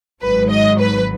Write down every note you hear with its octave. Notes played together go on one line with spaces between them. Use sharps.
G#1 G#2 F#3 B4
D#5
B4